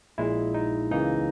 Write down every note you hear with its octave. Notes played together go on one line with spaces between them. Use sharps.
A#1 A#2 G#3 E4
D#4
C#2 C#3 E3 A#3 D#4